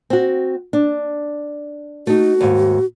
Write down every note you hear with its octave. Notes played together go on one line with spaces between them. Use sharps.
C4 F#4
D4
A3 D#4 F#4
D#2 G#2